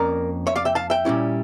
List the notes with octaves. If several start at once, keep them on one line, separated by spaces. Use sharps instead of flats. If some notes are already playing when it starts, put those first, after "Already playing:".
Already playing: F2 A#3 C#4 A#4 D5
C#5 E5
D5 F5
E5 G5
F5 A5
E5 G5
A#2 G3 C#4 E4